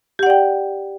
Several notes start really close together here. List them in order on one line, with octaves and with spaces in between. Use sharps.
G4 F#5 D5 G5